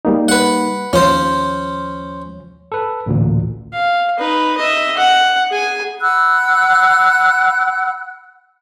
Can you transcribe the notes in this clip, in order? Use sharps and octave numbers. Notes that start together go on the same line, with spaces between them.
G3 A#3 D#4
B4 F#5
D#2 F3 C#4 C5 C#5
A4 B4
A1 D2 A#2
F5
D#4 B4
D#5 E5
F#5
G#4 G#5
F#5 B5 E6 F#6